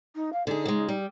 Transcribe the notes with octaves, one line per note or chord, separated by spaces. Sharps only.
D#4
F5
D3 D#4 G#4
C#3 G#3
G3